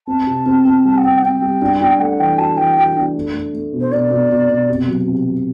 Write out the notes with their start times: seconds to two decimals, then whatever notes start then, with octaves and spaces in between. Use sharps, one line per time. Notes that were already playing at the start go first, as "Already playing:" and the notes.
0.07 C4 A5
0.27 C3
0.46 C4
0.65 C4
0.85 G3 A5
0.98 F#5
1.04 C4 G5
1.18 F#5
1.22 C4 G5
1.42 G3
1.61 D4
1.81 D4
2.00 A3 F#5
2.19 E3 G5
2.38 F#4 A5
2.57 E3 G5
2.76 F#4 G5
2.96 D4
3.15 A3
3.34 A3
3.54 A3
3.73 B2
3.81 C5
3.92 B2 D5
4.11 B2
4.30 B2
4.49 B2
4.69 C3
4.88 F#3
5.07 C3
5.26 F#3